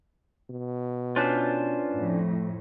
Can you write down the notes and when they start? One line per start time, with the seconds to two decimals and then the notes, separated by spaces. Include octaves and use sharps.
0.50 B2
1.16 C#4 D4 F4 B4 C5 D5
1.93 F2 A2